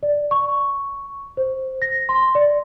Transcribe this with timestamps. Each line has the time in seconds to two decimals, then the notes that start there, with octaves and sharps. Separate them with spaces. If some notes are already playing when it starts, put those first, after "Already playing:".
0.03 D5
0.31 C#6
1.37 C5
1.82 A#6
2.09 C6
2.35 D5